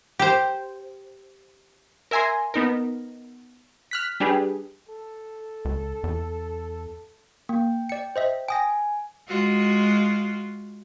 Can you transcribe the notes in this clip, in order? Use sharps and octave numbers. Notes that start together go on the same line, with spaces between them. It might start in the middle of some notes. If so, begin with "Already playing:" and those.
G4 C5
A#4 E5 G#5 A#5 C6
B3 D#4 A#4
F6 F#6 B6
G3 D4 G4 G#4 B4
A4
C#2
E2
A#3 G5
D5 G5 C#7
C5 D#5 E5
G5 G#5 D#6 A#6
G#3 F4 F#4